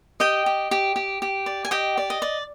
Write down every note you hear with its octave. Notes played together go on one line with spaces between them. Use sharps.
G4 D#5 G5
G4
G4
G4
G4
D5
G#5
G4 D#5 G5
D5
D#5
D5